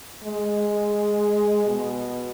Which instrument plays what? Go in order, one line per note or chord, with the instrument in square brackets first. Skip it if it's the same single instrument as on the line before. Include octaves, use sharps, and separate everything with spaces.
[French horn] G#3
B2